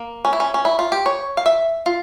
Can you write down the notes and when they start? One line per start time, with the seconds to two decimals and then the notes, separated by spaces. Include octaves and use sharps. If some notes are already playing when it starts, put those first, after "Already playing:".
Already playing: A#3
0.25 C#4
0.33 E4
0.40 C#4
0.54 C#4
0.65 E4
0.79 F4
0.92 G4
1.06 C#5
1.37 F5
1.46 E5
1.86 F4